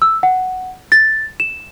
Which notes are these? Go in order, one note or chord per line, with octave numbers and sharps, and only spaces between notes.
E6
F#5
A6
E7